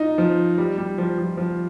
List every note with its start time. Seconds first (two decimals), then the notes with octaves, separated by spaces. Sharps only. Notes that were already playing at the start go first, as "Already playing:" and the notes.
Already playing: D#4 F4
0.18 F3
0.58 G3
0.78 G3
0.98 F3
1.18 F3
1.37 F3